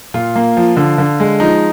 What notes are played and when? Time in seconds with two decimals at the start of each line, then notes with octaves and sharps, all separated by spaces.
0.14 A#2 F4
0.36 A#3
0.57 F3
0.77 D3
0.98 D3
1.20 G#3
1.40 F3 D#4